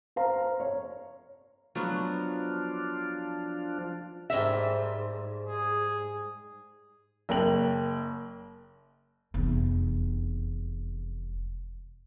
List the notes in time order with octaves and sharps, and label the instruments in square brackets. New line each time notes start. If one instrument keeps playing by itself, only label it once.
[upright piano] C5 F5 A#5
C#5
[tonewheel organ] F3 D4 F4 [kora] F#3 B3 F#4
[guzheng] G#2 G3 A#4 [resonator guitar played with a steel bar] E5
[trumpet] G#4
[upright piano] F#1 A#3 G5 F#7
[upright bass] F1 E2